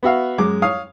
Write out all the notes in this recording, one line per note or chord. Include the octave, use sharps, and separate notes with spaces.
B3 F#4 E5 F5
F#2 G#3 D6
C#5 F5 D#6